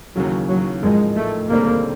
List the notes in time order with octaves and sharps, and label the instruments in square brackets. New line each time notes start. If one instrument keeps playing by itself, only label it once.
[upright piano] D#2 C#3 E3 [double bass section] F#3
[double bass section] F#3
[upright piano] A1 G#2 F3 A#3 D#4 [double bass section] G#3
[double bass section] A3
[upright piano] E1 D#2 D3 G3 C4 [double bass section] A#3